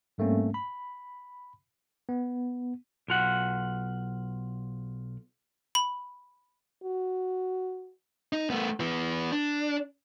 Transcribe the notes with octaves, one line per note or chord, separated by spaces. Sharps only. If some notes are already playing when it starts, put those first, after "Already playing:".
G#2 G3 A3 A#3 C4 C#4
B5
B3
B1 F4 F#5
B5
F#4
D#4
A3 B3
E3 B3
D4